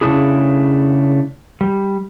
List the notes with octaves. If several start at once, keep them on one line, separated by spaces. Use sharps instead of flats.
C#3 G#3 A3 D4 E4 G#4
G3